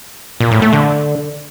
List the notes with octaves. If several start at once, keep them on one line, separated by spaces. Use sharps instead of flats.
A#2
A2
A3
D3